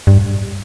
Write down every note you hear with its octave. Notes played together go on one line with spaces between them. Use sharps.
G2